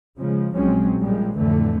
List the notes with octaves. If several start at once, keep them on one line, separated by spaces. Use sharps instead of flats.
C#3 F3 G#3
A#1 F3 F#3 G#3 C4 C#4
A#2 F3 G3 G#3
F2 A2 D3 E3 A3